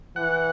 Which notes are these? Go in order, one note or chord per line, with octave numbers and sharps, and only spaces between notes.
E3 F#5